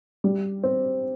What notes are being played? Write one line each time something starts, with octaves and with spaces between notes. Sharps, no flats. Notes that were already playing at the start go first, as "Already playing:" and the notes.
G3
C4